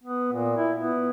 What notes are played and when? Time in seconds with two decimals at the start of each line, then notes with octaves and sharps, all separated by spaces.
0.04 B3
0.33 A#2
0.57 E4
0.77 B3